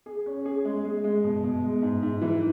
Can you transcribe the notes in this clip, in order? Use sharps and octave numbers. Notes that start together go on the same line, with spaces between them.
G#4
C#4
G#4
G#3
G#3
G#3
B2
B2
G#3
G#2
G#2
E3